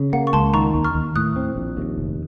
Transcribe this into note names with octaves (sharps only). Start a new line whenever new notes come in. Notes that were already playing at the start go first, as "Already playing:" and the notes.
Already playing: C#3
A#3 F#5
C#6
C#2 A5 C6
D#3 A#5 C#6
D#2
C#6 F6
D#2
A2 D#6 F#6
C4
A#1
D#2
F1